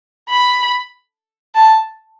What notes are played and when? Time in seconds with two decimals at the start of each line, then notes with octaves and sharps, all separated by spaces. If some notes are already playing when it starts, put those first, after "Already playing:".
0.29 B5
1.55 A5